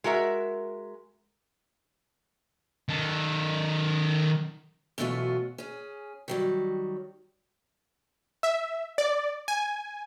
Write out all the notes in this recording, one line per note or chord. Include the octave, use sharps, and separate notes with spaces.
G#3 F#4 A#4 E5
D#3 A4
F#2 B2 E3 A3 F4 F#4
C#4 G#4
D#3 F#3 G3
E5
D5
G#5